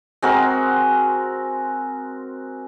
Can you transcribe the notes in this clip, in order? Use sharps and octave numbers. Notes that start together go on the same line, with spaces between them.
G#3 C4 F#4 A#4